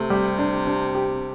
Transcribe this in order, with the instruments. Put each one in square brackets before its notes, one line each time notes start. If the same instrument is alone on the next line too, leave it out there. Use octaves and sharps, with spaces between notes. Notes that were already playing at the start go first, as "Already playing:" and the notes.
Already playing: [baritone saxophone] C3 [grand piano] A3
[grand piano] G3
D4
D4
G4